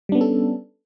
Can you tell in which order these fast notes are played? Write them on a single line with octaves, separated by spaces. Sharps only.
G3 D4 B3 C#4 A4